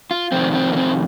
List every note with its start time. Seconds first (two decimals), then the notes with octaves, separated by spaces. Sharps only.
0.11 F4
0.32 F2 C3 D#3 C4
0.54 C4
0.72 A#3
0.77 C4